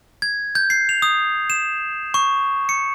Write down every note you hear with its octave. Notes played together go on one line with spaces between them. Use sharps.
G#6
G6
C7
F7
D#6
E7
C#6
C#7